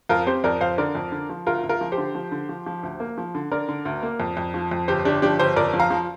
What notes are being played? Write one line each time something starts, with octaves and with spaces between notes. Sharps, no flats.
F2 F4 A#4
C4 G4 C5
F2 A#4 D5
F2 C5 F5
D3 A#4 D5
F2
D3
F3
D2 F4 A#4
D2
F4 A#4
F3
G4 C5
D3
F3
D3
F3
F3
D2
A#3
F3
D3
D3 A#4 D5
D3
D2
A#3
F2
F2
F3
F2
G1 G4 C5
G1 D4 G4
F3 D4 G4
G1 G4 C5
F2 A#4 D5
F3
F5 A#5
F3